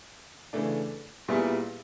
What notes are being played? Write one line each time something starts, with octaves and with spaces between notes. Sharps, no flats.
C#3 E3 A3 D4
A#2 G3 B3 E4 G#4